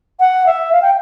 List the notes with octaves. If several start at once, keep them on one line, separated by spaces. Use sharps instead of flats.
F#5
E5
F5
G5